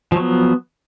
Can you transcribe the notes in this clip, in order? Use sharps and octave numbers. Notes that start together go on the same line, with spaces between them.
F3 F#3 B3